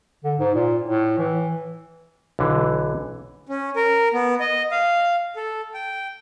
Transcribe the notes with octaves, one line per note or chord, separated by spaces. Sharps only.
D3
G#2
A#2
A2
E3
B1 D3 E3
C#4
A#4
B3
D#5
F5
A4
G5